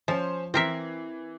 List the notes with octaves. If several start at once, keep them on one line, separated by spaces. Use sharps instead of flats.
F3 C#4 C5
E3 C4 A#4 E5 C7